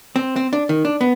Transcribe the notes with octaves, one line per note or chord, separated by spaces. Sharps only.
C4
C4
D4
D#3
D4
B3